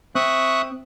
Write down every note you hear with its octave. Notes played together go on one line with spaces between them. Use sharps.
C4 E5 C#6 D#6 F#6